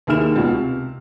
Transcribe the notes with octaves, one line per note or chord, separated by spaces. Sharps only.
D#2 D#3 E4 G#4 F6 E7
C#2 B2
C3